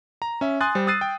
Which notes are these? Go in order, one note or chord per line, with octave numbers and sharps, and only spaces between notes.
A#5
C#4 E5
G#5 C6 D#6 F#6 A6
G3 C5
D#6 E6 F#6 A6 C7 D#7
G5